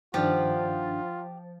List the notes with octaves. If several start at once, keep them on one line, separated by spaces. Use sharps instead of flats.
G2 D#3 F3 D4 F4 G4 F#5